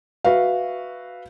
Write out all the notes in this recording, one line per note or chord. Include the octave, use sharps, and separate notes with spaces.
F#4 B4 E5 F5